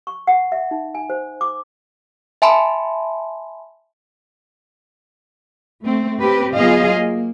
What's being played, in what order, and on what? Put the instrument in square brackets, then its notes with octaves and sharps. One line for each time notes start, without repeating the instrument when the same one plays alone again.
[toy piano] C#6
F#5
E5
D#4
G#5
C5
D6
[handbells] E5 G#5 A5 B5 C6
[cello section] A3 C4
C4 G4 B4
F#3 B3 F4 G#4 D#5 F5
A#3